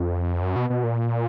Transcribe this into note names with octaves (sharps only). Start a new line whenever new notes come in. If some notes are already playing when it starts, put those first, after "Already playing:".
Already playing: F2
F#2
B2
B2
A#2